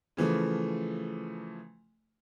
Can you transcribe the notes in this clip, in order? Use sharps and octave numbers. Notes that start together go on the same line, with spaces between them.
C#3 E3 F3 A3